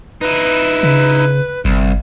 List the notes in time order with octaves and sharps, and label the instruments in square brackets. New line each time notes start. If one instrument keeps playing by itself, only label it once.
[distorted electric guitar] D#4 E4 [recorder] B4
[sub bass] C#3
[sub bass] G1 [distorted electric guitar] C2